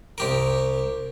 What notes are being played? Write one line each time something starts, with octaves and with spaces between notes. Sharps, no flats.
C2 G4 A#4